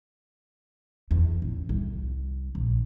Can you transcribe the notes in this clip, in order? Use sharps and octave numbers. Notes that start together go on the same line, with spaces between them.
E2
A1
C2
A#1